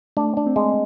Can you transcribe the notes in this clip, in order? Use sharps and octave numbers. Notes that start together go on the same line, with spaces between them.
A3 D4
D4
C4
G#3